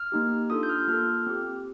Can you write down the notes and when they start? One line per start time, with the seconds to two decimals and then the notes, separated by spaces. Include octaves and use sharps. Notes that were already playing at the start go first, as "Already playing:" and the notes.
Already playing: F6
0.12 A#3 D#4 G4
0.50 D4 F4 A4 D#6
0.63 G6
0.69 F6
0.88 A#3 F4 A4 F6
1.27 C4 G4